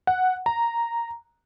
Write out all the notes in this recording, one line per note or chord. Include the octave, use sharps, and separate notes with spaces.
F#5
A#5